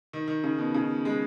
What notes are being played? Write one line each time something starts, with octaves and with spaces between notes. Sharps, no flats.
D#3
D#3
C#3
B2
C#3
G#3